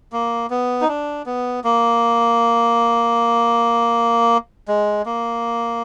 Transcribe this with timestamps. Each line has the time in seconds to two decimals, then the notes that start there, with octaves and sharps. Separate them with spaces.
0.12 A#3
0.50 B3
0.81 D#4
0.88 D4
1.26 B3
1.64 A#3
4.68 G#3
5.06 A#3